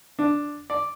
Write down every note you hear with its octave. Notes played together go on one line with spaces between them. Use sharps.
D4
D5